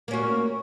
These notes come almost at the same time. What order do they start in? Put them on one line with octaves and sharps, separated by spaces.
A#3 C#4 F#4